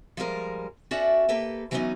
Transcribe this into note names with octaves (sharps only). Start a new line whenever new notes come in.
F3 G3 G#3 A#4
C#4 F#4 A4 D5 E5
A#3 G4 A4 B4
E3 F#3 A3 B3 C#4 D#4